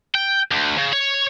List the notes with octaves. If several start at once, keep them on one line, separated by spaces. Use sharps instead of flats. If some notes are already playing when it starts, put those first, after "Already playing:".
G5
D2
C#3
C#5